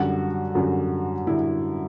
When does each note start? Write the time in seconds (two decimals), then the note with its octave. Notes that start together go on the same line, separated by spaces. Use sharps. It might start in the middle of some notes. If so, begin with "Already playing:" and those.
Already playing: F#2 D3 G3 F#4
0.55 F#2 D3 G3
1.27 D3 G3 E4